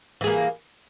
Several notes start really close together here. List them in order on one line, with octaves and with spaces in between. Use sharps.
E3 G#4 A#3